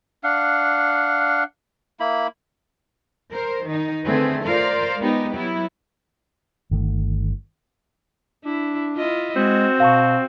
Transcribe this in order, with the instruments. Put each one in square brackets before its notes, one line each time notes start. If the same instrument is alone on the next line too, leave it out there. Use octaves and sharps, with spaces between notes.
[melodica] D4 F5 F#5
A#3 E4 B5
[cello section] A#4 C5
D#3 D#4
D3 A3 C4 G#4 B4
F4 A#4 C5 D5 F5
G#3 B3 D#4 G4
F#3 B3 E4
[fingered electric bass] G1 D#3 A3
[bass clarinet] D4 [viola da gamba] E4
[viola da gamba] E4 F4 D#5
[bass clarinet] G#3 [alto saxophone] C4 [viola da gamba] F#4
[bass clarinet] B2 [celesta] F5 A5 C#6